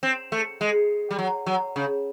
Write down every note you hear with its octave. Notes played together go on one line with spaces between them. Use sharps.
C4
A3
G#3
G3
F#3
F#3
C#3